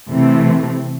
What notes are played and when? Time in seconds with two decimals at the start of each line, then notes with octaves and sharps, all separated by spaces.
0.09 C3 E3 A3